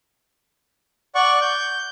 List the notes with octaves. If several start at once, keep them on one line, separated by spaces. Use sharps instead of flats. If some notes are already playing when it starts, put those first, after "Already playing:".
D5 F#5 C#6
G6